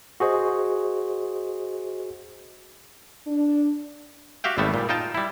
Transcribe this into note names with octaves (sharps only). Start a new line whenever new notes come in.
F#4 G#4 C5 D#5
D4
F#4 G4 E5 F5 G5
G#1 G3 A3 B3 E5
A#2 G3
D#4 F4 G5 A5
G3 E4